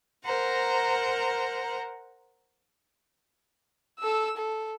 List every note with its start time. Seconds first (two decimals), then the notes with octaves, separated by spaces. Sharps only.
0.23 A#4 C5 F#5 A#5
4.00 A4 E6
4.37 A4